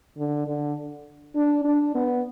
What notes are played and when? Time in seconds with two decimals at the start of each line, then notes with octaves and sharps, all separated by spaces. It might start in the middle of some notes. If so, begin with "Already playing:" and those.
0.17 D3
0.47 D3
1.35 D4
1.65 D4
1.95 B3